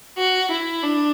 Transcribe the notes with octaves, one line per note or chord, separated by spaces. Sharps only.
F#4
E4
D4